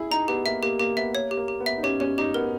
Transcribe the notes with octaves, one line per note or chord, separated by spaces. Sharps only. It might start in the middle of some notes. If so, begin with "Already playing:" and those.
Already playing: E4 G#4
D#4 A#5
B3 G4
A#3 E5
A#3 G4
A#3 G4
B3 E5
A#3 C#5
G4
A#3
G4
B3
E5
D#4
C#4 G4
C#4 G4
D#4 G4
B3 A#4